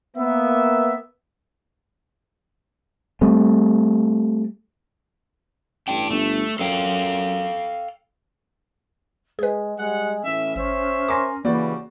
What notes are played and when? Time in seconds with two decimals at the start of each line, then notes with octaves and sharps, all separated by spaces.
0.17 A#3 B3 E5
3.21 G3 A3 C4
5.88 A1 D4 G5
6.11 G1 A3
6.59 F#2 A4 F5 G5
9.39 G#3 G#4 B4
9.78 G3 G#3 F#5
10.25 A2 E3 C#4 E5
10.56 G#1 C5 C#5 E5
11.08 A#4 G#5 C6 D6 A#6
11.45 C#3 E3 G3 A#3 F#4 D5